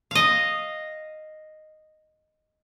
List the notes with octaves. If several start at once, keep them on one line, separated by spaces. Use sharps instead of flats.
D#5 F5